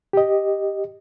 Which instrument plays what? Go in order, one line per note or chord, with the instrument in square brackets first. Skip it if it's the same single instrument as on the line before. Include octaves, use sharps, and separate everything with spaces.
[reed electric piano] G4 D#5